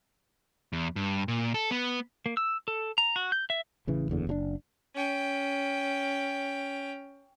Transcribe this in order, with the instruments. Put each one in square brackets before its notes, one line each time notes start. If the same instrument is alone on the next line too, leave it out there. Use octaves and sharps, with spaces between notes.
[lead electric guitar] E2
G2
A#2
A4
B3
[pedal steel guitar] A#3
E6
A4
A#5
F#4
G6
E5
[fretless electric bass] A1 C#3 E3
F#1 E2 D3
F#1 C3 D4
[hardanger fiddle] C#4 G5